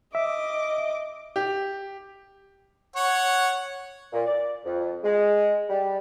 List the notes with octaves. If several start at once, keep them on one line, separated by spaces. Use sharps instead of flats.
D#5 E5 D6
G4
C#5 F#5
A#2
D5
F2
G#3
G3